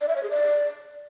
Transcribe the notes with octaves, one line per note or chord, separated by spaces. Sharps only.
D5
E5
C#5
G#4
D5